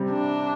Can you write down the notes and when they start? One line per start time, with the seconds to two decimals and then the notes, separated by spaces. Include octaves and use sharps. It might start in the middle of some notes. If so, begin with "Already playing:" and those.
Already playing: C3 G3 C4
0.11 D4